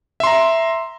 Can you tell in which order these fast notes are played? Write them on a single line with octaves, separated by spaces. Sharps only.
E5 C6 A#5